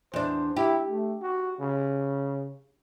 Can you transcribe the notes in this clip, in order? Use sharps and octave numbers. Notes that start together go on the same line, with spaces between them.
E2 D4 C5
E4 G4
A3
F#4
C#3